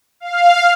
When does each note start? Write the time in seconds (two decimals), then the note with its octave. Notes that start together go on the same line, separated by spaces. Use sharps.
0.20 F5